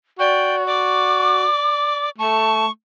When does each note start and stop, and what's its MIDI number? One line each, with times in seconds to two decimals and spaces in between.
0.19 1.45 66
0.19 0.65 74
0.19 0.55 79
0.67 2.10 74
0.67 2.09 86
2.19 2.68 57
2.19 2.66 81
2.19 2.71 85